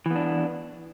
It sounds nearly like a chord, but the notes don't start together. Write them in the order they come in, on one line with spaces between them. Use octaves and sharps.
E3 B3 D4